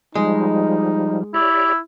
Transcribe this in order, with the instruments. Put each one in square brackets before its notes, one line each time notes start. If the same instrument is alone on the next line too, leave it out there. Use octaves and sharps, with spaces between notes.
[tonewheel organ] F3 G3 [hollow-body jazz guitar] G#3 [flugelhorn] D#4
[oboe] E4 [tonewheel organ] G4 C#5 D5